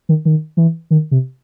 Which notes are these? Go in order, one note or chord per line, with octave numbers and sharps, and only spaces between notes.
D#3
D#3
E3
D#3
C3